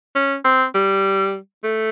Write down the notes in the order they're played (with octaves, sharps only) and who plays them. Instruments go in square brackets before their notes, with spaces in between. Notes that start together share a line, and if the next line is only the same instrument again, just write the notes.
[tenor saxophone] C#4
C4
G3
A3